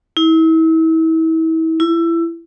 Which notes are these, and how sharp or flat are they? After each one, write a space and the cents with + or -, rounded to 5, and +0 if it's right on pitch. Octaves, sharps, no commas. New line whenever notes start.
E4 -35
E4 +20